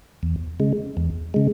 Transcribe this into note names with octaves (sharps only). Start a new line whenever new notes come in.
E2
C#3 G#3
E2
C#3 G#3